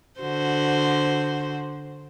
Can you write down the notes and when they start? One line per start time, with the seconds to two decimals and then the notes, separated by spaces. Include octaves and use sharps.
0.20 D3 F#4 C5